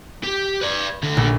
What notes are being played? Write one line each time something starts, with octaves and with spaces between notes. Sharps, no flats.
G4
B4 D5
D2 D3
A#1